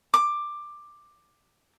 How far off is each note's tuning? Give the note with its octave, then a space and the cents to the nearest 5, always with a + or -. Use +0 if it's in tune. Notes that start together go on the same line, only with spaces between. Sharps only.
D6 +10